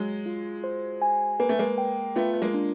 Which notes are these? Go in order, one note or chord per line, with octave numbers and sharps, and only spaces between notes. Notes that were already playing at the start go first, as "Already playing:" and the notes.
Already playing: F#3 G#3 G#4
F4
C5
G#5
A#3 B4
A3
G#3 A#3
G5
A3 B3 F4
B3
G#3 A#3
D4